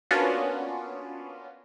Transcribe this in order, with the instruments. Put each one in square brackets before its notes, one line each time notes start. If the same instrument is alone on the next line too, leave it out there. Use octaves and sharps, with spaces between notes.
[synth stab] A#3 B3 C#4 D4 F4 F#4